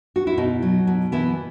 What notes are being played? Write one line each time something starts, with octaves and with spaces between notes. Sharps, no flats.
F#4
E4
B2 D#4
F#3
B2
E3 B3 E4